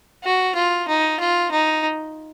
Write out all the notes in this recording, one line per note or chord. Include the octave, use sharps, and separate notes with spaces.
F#4
F4
D#4
F4
D#4